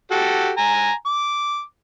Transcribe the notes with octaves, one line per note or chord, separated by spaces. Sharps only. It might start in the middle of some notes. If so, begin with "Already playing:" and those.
F#4 G4 A4
G#5 A#5
D6